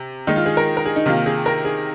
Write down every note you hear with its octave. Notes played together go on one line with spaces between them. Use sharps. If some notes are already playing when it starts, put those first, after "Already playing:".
Already playing: C3
D#3 G#3 D#4
F4
G#4
A#4
A#4
G#4
D#4
C3 D#3 A#3 F4
G#4
A#4
G#4